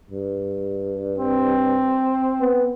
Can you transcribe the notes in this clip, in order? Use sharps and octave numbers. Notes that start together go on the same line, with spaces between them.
G2
C4
B3